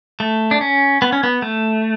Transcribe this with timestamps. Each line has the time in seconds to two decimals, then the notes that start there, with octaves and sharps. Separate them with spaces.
0.20 A3
0.51 D4
0.61 C#4
1.02 B3
1.12 C#4
1.23 B3
1.42 A3